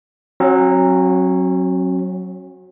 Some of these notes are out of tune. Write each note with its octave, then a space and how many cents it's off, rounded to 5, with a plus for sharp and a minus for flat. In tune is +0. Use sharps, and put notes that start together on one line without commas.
F#3 +0 C#4 -45